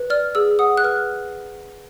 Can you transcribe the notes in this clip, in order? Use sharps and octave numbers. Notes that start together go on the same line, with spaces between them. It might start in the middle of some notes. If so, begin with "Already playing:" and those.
Already playing: B4
D5 F6
G#4 E6
F#5 D#6
F#6
B4 F6